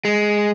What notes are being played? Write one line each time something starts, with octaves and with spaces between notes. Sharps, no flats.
G#3